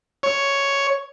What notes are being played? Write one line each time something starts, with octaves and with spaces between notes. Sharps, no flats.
C#5